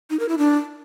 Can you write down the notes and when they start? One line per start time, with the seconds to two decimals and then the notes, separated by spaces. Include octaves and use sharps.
0.10 D#4
0.20 A#4
0.29 E4
0.38 D4